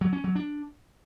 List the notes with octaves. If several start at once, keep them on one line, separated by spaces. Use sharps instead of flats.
F#3
C#4
F#3
D4